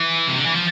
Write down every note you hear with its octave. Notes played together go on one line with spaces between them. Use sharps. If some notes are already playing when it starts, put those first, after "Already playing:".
Already playing: E3
C3
D3
E3
F3